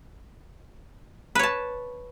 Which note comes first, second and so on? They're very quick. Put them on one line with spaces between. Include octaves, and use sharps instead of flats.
B4 C#5 A5